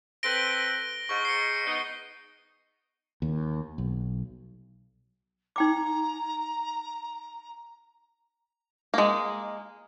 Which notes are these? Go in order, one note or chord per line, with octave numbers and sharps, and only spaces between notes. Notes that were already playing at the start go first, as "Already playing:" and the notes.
C4 A4 B4 A#6 D7 G7
G#2 C#6 G7
C7 C#7
B3 D#4
D#2
B1
D#4 G5 A#5 D6
G#3 A#3